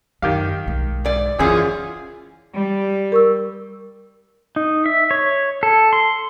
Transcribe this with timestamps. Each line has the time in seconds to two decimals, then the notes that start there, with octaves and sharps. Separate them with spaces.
0.22 F#2 D#3 G4 F5
0.66 B1 G#3
1.05 G#2 D5
1.39 F#2 D3 E3 C#4 F4 G#4
2.55 G3
3.12 A#4 C#6 E6
4.56 D#4
4.86 E5
5.11 C#5
5.63 A4
5.93 C6